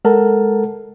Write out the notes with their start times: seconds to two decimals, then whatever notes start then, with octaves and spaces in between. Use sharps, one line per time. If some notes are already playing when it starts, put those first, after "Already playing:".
0.05 G#3 A4 A#4 F#5 A5